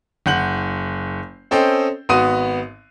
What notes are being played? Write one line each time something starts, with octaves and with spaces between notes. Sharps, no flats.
F#1 F#5 G6 F#7
C4 C#4 A4 C5 D#5 G5
G#1 B3 F#4 D#6 D#7